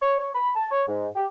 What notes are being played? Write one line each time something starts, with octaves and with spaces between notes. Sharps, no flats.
C#5
C#5
B5
A5
C#5
G#2
G4